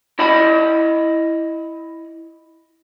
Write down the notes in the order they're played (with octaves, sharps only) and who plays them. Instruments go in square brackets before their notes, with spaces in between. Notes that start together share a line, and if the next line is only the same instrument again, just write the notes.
[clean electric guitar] E4 D#5 F#5 B5